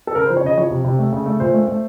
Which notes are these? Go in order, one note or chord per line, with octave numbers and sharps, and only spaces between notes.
A4
C#3 A#4
F3 C5
C#5
C#3 D#5
F3 C#5
C3
C3
A3
C#3
A3
A#2 C5
A3
A3